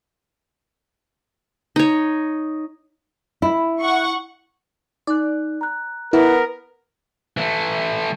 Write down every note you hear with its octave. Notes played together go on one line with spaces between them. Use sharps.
D#4 C#5
E4 E5
F#5 C#6
D#4 D5 F#6
A#5 F#6
B3 E4 A#4
E3 A3